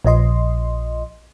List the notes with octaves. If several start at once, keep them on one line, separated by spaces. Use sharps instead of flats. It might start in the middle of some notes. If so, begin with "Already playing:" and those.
A#1 F3 D#5 C6